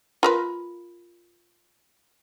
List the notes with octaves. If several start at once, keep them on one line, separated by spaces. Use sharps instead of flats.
F4 A#4 B4